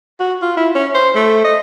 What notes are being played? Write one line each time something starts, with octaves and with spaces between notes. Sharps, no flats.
F#4
F4
E4
C#4
C5
A3
D#5